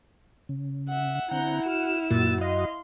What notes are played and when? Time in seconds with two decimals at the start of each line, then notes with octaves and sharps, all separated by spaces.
0.49 C#3
0.89 E5 F#5
1.31 D3 C4 E4 F#5 A#5 G6
1.66 F#4 F6 E7
2.10 F#2 A#2 F#4 E6 A6
2.41 D#5 F5 C6